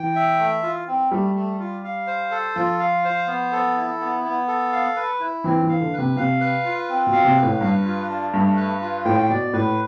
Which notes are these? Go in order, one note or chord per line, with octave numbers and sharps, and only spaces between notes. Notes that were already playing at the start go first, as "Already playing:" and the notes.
Already playing: E3 G5
E5
A3
F4
C4
G3 A3
A3
F4
F5
C5
A4
F3 F4
F5
C5
B3
A4
E4
B3
B3
A4
F5
B4
E4
E3 C4
E3
F5
D3
B4
C3
C3 F5
B4
F4
C4
B2
F5
C3
B4
A2
G2 B4
F4
D4
G2 A3
B4
F4
A2 G5
B2 D5
A2 B4